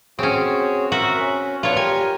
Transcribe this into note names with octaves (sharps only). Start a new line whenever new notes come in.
C4 C#4 F#4 G#4 C#5
F#4 A#4 E5
C#4
B3 D4 F4 C#5
G4 A#4 G#5